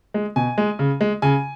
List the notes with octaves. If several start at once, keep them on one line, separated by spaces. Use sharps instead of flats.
G#3
B2 G#5
G#3
C#3
G#3
C#3 G#5